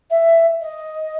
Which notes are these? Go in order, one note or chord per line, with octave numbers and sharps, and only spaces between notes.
E5
D#5